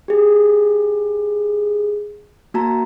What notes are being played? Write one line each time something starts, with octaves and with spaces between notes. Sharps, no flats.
G4 G#4
A#3 F#4 A5 A#5